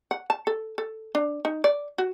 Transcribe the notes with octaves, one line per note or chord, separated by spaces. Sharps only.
F#5
A5
A4
A4
D4
D#4
D5
F#4